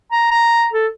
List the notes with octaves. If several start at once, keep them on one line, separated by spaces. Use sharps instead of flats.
A#5
A#5
A4